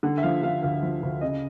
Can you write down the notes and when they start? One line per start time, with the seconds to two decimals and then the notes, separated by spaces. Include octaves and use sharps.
0.03 D3 F#5
0.18 E5
0.23 F3 F5
0.43 D3 F5
0.63 D2 F5
0.83 F3
1.03 D2
1.21 C#3 D#5